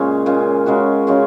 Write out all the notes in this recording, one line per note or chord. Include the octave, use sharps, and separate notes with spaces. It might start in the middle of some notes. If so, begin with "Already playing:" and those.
Already playing: A#2 C#3 G#3 C#4
A#2 G#3 C#4
C#3 G#3 C#4 F#4
C#3 G#3 C#4 F#4